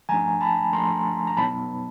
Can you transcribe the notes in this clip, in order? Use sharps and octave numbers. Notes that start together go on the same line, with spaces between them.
F3 A3 D4 G#5 A#5
A5 B5
F3 A3 D4 A#5 C6
A#5
B2 F#3 B3 D#4 A5 B5